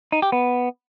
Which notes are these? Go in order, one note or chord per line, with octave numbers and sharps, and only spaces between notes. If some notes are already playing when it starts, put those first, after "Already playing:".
D#4
G4
B3